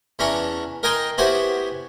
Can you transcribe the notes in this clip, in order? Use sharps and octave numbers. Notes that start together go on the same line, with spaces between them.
E2 E3 C#4 D4 A#5 C#6
A#4 D#5 G5 G#5 A#5 C6
B3 E4 F#4 G4 C5 G#5